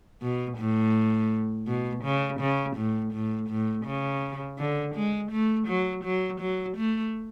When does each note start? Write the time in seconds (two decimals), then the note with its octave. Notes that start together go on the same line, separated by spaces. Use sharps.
0.22 B2
0.58 A2
1.67 B2
2.04 C#3
2.40 C#3
2.77 A2
3.13 A2
3.49 A2
3.85 C#3
4.59 D3
4.95 G#3
5.32 A3
5.68 F#3
6.04 F#3
6.41 F#3
6.77 A3